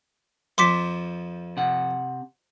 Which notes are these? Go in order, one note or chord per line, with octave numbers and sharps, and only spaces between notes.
F2 F3 C6 D6 B6
C3 F#5